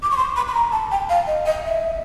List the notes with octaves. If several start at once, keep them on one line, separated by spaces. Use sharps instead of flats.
D6
C#6
C6
B5
B5
A#5
A5
G5
F5
D#5
D#5
E5